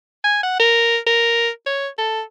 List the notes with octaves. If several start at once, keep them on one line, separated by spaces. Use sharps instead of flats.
G#5
F#5
A#4
A#4
C#5
A4